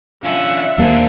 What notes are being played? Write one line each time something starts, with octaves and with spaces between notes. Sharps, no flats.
D3 C#4 F4 E5 F#5
D#2 G3 A#3 D4 G#4 C5 F5